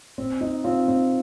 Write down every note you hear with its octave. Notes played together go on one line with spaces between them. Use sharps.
C4
D#4
C4 F4
C4